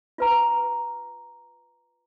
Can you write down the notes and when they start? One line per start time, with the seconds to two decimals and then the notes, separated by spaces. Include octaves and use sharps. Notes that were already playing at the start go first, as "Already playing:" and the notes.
0.18 F4 B4 A#5